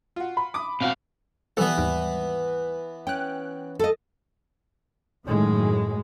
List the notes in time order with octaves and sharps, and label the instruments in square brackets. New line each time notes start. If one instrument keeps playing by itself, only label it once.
[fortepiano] F4 F#4
[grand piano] B5
[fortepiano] D6 D#6
[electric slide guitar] B2 F5 [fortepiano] C4 F#4
[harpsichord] E3 B3 [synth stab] G3 A4
[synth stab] D#2 G#2 G3
[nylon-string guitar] C#4 [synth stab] G5 F#6
[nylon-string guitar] A4 D#5
[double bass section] F#2 A2 D#3 G#3